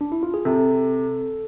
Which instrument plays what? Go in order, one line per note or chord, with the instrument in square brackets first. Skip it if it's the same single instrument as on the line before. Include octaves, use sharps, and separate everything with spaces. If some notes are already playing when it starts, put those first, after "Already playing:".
[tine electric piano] D4
E4
F4
G#4
[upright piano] C3 [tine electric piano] A4